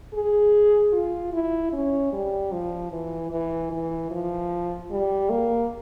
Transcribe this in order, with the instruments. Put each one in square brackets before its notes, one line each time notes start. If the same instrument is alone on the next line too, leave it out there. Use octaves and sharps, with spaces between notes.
[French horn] G#4
F4
E4
C#4
G3
F3
E3
E3
E3
F3
G3
A#3